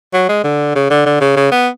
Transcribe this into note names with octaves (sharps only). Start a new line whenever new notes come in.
F#3
G#3
D3
C#3
D3
D3
C#3
C#3
B3